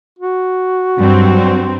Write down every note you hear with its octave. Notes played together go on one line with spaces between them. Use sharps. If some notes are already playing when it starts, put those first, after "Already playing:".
F#4
G2 F#3 C4